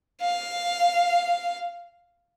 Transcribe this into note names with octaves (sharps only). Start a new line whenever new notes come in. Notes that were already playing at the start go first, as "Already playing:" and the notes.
F5